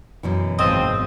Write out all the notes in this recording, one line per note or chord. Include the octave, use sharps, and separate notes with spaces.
F#2 B2 E3
G#1 E2 G#2 F3 C4 D#5